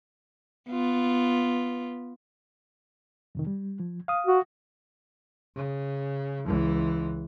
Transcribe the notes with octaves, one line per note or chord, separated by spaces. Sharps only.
B3 F4
F2 C3 D#3
G3
F3
F5 D#6
F#4
C#3
C#2 E3